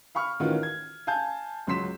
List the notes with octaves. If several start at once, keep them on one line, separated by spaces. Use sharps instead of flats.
F5 B5 C#6 F6
A2 D#3 E3 C#4 F4 F#4
G#6
F5 G#5 A5 G6
C#2 F#3 C6 B6 E7